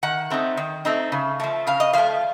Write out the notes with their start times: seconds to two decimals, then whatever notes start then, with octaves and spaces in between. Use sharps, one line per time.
0.03 D#3 F#5
0.30 A3 C4 D#4
0.57 D#3
0.85 A3 C4 D#4
1.12 C#3
1.40 F3 A3
1.67 C#3 F5
1.80 D#5
1.93 F3 A3 F5